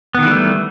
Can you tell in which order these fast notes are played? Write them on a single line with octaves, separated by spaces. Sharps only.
B3 D#3 E3 G3 A3